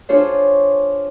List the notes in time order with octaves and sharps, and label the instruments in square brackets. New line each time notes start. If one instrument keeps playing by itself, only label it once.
[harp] D4 F4 G#4 C5 C#5 C#6